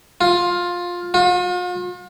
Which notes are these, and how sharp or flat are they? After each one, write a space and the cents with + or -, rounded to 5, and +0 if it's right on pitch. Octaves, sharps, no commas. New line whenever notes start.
F4 +15
F4 +45